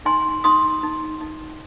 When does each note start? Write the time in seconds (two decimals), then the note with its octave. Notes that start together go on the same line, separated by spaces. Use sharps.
0.05 D#4 G#5 C6
0.44 D#4 C6 D#6
0.83 D#4
1.21 D#4